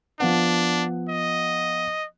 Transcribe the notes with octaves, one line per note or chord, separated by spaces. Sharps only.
F3 B3 D4 F#5
D#5